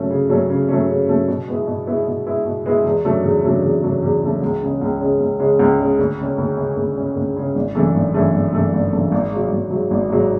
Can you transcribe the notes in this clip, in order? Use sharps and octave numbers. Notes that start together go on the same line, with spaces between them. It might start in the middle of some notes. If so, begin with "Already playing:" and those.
Already playing: C#3 F#3 A3 C#4
C#3
F#3 A3 C#4
C#3
F#3 A3 C#4
C#3
F#3 A3 C#4
B2
G#3 B3 E4
B2
G#3 B3 E4
B2
G#3 B3 E4
B2
G#3 B3 E4
E2
C#3 F#3 A3 D4
E2
C#3 F#3 A3 D4
E2
C#3 F#3 A3 D4
E2
C#3 F#3 A3 D4
C#2
C#3 G#3 C#4
C#2
C#3 G#3 C#4
C#2
C#3 G#3 C#4
C#2
C#3 G#3 C#4
D2
C#3 G#3 C#4
D2
C#3 G#3 C#4
D2
C#3 G#3 C#4
D2
C#3 G#3 C#4
G#1
F#2 E3 A3 D4
G#1
F#2 E3 A3 D4
G#1
F#2 E3 A3 D4
G#1
F#2 E3 A3 D4
G#1
G#2 F#3
G#1
G#2 F#3
G#1
G#2 F#3